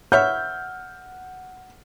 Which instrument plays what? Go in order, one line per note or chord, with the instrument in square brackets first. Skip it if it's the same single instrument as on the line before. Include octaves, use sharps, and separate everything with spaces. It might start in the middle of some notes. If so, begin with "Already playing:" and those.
[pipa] B4 C#5 E5 [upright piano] F#5 F6 G6